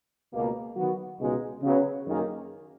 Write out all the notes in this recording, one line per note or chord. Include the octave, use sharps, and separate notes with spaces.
C#2 B2 A#3
D#3 F#3 B3 F#4
C#2 B2 G#3 D#4 G#4
C#3 F#3 B3
F#2 D#3 A#3 D#4 G#4